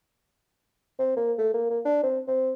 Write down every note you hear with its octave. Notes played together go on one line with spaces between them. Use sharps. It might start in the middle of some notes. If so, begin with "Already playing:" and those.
C4
A#3
A3
A#3
A#3
D4
C4
C4